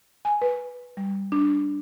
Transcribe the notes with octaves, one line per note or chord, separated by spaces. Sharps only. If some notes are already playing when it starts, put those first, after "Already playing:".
G#5
B4
G3
D4